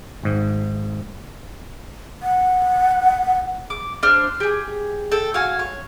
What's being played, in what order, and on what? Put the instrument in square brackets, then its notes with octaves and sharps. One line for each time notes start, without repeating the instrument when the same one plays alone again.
[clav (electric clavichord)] G#1 G#2
[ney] F#5
[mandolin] D6
D4 C5 F6
G4 G#4
A4 G5
F#4 F5 G#5
C#5